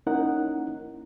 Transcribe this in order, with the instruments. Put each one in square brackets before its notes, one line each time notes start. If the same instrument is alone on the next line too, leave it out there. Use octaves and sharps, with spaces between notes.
[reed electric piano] A#3 C#4 D#4 E4 A#4 F#5